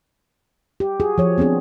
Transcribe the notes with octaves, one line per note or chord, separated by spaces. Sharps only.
G4
F#4 G#4
F3 C#5
B3 C4 D4 G#4